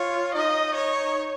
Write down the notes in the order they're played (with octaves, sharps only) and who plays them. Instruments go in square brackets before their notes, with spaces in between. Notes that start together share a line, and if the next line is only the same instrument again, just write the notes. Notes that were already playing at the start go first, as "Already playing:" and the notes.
Already playing: [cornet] F4 [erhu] C#5
[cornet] D#4 [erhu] D#5
[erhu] C#5